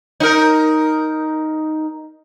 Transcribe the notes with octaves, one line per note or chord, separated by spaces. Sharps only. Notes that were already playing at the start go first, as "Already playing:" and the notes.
D#4 A#4